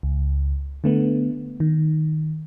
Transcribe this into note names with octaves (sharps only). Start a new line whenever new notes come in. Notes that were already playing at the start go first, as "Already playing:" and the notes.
C#2
D3 A3 B3
D#3